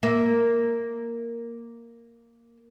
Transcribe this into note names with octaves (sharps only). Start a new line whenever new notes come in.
A#3 E5